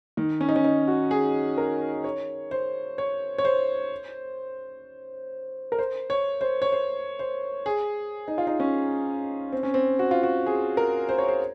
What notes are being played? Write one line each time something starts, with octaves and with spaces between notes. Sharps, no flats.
D#3
C#4
D#4
C#4
D#4
F#4
G#4
A#4
C#5
C5
C#5
C#5
C5
A#4
C5
C#5
C5
C#5
C5
C5
G#4
D#4
F4
D#4
C#4
C4
C#4
C4
F#4
F4
F#4
G#4
A#4
C5
C#5
C5